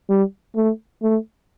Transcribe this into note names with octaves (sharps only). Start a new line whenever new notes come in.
G3
A3
A3